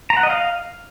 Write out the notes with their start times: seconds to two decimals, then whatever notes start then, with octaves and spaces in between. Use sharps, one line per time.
0.10 A#5
0.17 F#5
0.23 D#5
0.30 F5